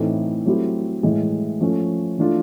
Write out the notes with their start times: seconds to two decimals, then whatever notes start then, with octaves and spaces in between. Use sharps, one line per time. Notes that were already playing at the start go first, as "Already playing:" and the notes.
Already playing: A2 E3 A3 C4 D#4
0.46 F#3 A3 C4 E4 G4
1.03 A2 E3 G#3
1.60 F3 A3 C#4
2.18 E3 A3 D4 F4